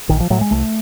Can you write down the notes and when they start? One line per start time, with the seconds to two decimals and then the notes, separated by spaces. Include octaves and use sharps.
0.09 A#1 D#3
0.20 F3
0.30 A2 F#3
0.41 G#3
0.51 C2 A3